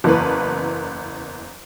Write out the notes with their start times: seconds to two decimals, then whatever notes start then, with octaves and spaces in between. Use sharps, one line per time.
0.04 F#1 E2 E3 A#3 B3 B4